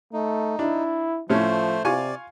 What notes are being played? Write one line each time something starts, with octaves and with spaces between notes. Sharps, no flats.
A3 D#4
D4 E4
A2 F3 A3 C#4 C5
C3 F4 D5 G#5 C#6